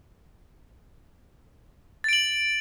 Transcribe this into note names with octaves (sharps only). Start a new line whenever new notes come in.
A6 D7 F#7